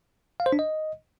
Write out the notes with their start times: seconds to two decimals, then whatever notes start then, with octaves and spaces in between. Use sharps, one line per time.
0.40 F5
0.46 C5
0.53 D4
0.59 D#5